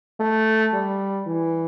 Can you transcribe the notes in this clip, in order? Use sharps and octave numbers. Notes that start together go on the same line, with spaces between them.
A3
G3
E3